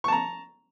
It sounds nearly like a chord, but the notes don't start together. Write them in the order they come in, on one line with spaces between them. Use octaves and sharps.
C#6 A5 A#5